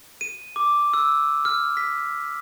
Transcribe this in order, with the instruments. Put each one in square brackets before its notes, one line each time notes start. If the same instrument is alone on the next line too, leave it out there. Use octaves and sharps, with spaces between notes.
[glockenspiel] D#7
D6
E6
F6
B6